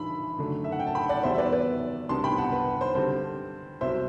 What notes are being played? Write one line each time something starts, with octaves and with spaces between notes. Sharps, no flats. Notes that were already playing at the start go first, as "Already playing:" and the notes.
Already playing: E3 G3 D4 B5 C6 E6
F#2 D3 A3 D4
E5
F#5
G5
A5
G5 B5
D5 F#5
E2 B2 G3 C5 E5
E5
B4 D5
B4 D5
C2 C3 G3 B3 D4 A5 C6
G5 B5
F#5 A5
B4
C5
G2 D3 G3 C4 C5
C2 B2 F#3 C5 E5